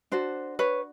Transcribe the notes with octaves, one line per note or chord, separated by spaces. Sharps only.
D4 F#4 A4 C5
B4 C#5